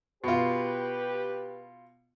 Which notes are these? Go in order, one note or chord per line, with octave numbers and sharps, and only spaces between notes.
B2 F4 G4 B4